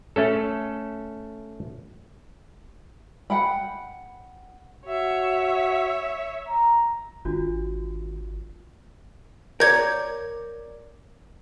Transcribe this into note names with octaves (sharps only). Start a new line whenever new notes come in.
A3 C#4 A4
F#5 G5 B5
F#4 C#5 E5
A#5
G#1 D4 F4 F#4
A#4 C#5 D5 G6 G#6